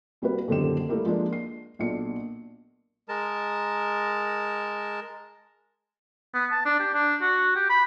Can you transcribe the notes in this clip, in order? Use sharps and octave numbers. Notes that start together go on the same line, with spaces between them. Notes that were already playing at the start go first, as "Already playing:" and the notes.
C2 G3 A#3 F#4 B4
D#1 F#2 D3 D#3 G4 E7
G3 A3 A#3 E4 G4 A#4
F3 G#3 A#3 D4 A#4
C7
B1 A#2 D4 C#7
G#3 A#4 A5
B3
A5
D4
G4
D4
F#4
G4
B5